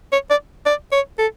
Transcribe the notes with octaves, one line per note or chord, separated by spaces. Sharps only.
C#5
D5
D5
C#5
A4